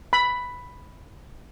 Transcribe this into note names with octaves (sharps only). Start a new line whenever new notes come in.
B5